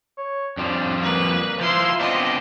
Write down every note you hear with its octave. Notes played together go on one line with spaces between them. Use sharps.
C#5
F2 F3 G3 D4
A#3 B4
F3 E4 F4 C6
B3 C4 D4 D#5